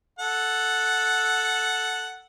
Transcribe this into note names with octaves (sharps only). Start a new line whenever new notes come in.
A4 F#5